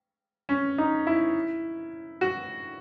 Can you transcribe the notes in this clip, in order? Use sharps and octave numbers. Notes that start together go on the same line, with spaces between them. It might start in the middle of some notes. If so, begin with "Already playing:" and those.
C#4
D#4
E4
F#4